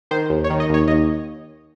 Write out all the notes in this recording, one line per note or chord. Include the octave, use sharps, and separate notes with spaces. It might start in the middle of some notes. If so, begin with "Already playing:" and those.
D#3 C5
D#2
C#5
D#3
D#5
D#2 C#5
D#2 D#5